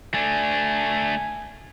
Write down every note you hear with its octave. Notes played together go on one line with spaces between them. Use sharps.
A3 D4 G#5